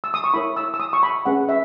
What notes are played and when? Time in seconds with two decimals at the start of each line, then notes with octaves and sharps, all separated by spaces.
0.04 E6
0.14 D#6
0.24 C#6
0.34 E4 A#4 C#5 B5
0.57 E6
0.74 E6
0.80 D#6
0.93 C#6
1.03 B5
1.26 C#4 G#4 B4 F#5
1.49 E5